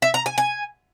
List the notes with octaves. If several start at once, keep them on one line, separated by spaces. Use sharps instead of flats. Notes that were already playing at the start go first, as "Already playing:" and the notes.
E5
A#5
G#5
G#5